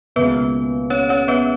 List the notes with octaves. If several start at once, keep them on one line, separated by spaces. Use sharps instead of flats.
C#2 B2 A#3 B3 B4
C#4 C#5
C#4 C#5
B3 B4